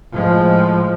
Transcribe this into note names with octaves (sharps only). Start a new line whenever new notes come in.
A2 F3 G#3